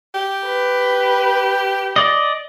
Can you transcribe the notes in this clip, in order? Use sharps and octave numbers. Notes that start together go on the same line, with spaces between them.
G4
B4
D5 D#5